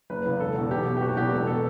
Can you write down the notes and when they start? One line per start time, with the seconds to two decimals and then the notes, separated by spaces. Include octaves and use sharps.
0.10 F#1 B4
0.26 E2 C#3
0.40 E1 A4
0.56 E2 B2
0.71 B1 G4
0.86 B2
0.97 G4
1.01 F#1 F#4
1.17 E2 B2 G4
1.32 E1 A4
1.47 B2 A4